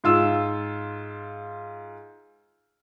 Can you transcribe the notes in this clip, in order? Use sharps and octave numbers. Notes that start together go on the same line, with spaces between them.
G#2 F4 E6